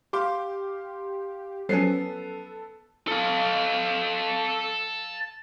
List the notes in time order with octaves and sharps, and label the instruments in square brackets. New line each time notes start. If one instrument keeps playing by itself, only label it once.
[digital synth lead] G4 [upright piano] F5 C6 D6
[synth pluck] F3 F#3 C#4 [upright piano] B3 C7 [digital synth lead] A4
[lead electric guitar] A4 F5